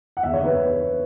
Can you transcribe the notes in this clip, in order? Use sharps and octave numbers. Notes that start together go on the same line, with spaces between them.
F#5
E2 E5
C#5
D3
B4